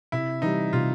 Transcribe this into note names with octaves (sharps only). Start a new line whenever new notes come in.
C3 E4
E3 G3 D#4
C3 F4